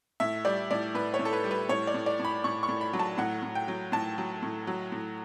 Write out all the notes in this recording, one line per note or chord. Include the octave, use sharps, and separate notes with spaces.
A2 E5
G3 D5
A2 D5
A2 B4
C#5
A2
A4
B4
G3
B4
A2 C#5
D5
A2
D5
A2
B5
A2 C#6
C#6
A2
B5
F#3
A5
A2 F#5
A2
G5
F#3
A2 A5
F#3
A2
F#3
A2